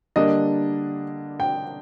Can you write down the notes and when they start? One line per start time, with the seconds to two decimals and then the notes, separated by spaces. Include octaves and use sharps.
0.16 D3 G3 A#3 D4 D#5
1.40 G5